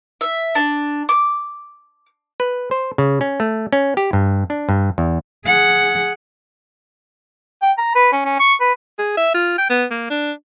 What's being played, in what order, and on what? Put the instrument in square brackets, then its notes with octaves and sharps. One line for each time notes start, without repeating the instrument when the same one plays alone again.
[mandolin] E5
D4
D6
[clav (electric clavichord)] B4
C5
C#3
C#4
A3
C#4
G4
G2
D4
G2
E2
[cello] G#4 F#5
[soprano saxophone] G5
A#5
B4
C#4
C#4
C#6
B4
[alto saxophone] G#4
E5
F4
G5
B3
A#3
D4